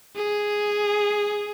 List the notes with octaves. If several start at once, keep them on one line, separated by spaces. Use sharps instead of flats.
G#4